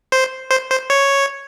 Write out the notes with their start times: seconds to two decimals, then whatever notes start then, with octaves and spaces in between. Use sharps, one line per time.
0.12 C5
0.51 C5
0.71 C5
0.90 C#5